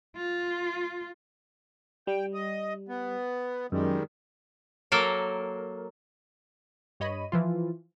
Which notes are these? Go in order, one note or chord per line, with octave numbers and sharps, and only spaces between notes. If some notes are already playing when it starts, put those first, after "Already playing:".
F4
G3 G5
D#5
B3
F#2 D#3 G3 G#3
F#3 A#3 A4 A#4
G2 C#5 D#5 B5 D#7
E3 F3 F4